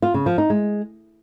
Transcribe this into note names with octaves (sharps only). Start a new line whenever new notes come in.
F4
C#3
F3
D#4
G#3